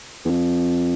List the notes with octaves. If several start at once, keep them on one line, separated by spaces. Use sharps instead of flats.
E2
F2